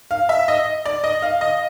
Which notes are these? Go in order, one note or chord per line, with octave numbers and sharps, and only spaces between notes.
F5
E5
D#5
D5
D#5
F5
D#5